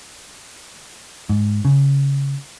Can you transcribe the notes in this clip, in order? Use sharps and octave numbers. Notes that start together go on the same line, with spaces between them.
G#2
C#3